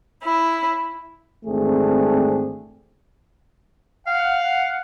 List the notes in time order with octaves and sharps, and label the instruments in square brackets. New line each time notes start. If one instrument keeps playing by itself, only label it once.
[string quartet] E4
[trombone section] G#1 E2 A3 C4 D4 G#4
[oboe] F5 [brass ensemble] F#5